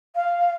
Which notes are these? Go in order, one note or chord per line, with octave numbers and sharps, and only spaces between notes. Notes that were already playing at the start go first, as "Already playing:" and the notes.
F5